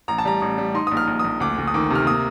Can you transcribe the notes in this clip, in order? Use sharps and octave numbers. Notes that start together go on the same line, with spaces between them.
A1 A#5
A5
G3 A#5
A1
G3
D#4 C6
A#1 D#6
F6
A#1
A#1 D#6
D2 D6
D2
D#6
D#3 D6
C3 F6
A#3 D#6